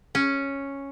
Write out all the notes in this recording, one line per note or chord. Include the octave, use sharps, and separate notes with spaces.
C#4